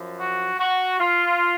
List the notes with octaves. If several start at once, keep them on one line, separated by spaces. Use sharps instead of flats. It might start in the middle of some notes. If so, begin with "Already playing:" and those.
Already playing: F#2 F3
F#4
F#4
F4